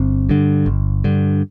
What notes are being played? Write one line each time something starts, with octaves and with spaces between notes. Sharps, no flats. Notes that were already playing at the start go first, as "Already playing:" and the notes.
Already playing: G1 C4
G2 D3
G1
G2 D3